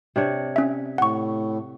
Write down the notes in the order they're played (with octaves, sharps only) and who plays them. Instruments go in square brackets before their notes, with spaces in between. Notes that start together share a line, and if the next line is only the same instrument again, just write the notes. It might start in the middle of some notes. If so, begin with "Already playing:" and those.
[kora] C3 D4 C#5
[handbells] C#4 E5
[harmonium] A2 [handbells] F#5 C#6